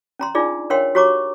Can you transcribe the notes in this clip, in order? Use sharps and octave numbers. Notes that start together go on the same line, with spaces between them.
C#4 A#5 C6
D4 D#4 F4 G#4 D5
D4 A#4 C#5 F5 G5 C6
F#4 G4 C#5 A#5 C#6 D6